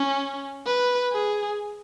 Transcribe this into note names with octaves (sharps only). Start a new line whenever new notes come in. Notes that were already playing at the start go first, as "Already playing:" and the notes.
Already playing: C#4
B4
G#4